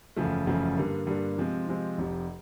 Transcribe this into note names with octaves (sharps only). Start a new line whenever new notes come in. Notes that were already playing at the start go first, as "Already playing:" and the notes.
F#1 E2 C#3 F3 A3
F#1 E2 C#3 F3 A3
G2 D3 G3 A#3
G2 D3 G3 A#3
C3 F3 G#3 C4
C3 F3 G#3 C4
F1 F2 C3 F3